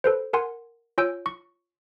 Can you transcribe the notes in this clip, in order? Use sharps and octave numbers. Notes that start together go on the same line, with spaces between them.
A4 B4 C5
A#4 F#5 G#5 C6
F4 C#5 G#5 E6 G6 D7
C#6